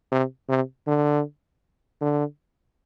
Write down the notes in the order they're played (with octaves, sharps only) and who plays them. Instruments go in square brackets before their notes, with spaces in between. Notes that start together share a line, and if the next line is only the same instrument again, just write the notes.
[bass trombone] C3
C3
D3
D3